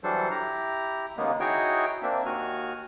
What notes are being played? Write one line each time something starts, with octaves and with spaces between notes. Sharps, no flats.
E3 F#3 G3 D4 A4 C5
E4 G4 A#5
D#2 C#3 G#3 A#3 B3
D#4 E4 F#4 G#4 C#5 G5
A#3 C4 D4 E5
D#2 D#3 F#4 G#5 F6